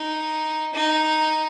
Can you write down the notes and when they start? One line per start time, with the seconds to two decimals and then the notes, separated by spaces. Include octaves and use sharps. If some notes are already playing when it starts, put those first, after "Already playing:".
Already playing: D#4
0.74 D#4